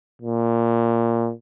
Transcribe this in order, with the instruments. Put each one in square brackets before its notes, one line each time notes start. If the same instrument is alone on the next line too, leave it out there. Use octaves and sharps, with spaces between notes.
[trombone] A#2